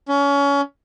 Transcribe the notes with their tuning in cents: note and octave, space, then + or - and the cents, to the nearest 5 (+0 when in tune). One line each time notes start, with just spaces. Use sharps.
C#4 +25